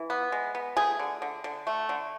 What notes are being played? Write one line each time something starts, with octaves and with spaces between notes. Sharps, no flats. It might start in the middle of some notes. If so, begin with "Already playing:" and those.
Already playing: E3
B3
G#3
B3
A3 G#4
D3
D3
D3
A3
D3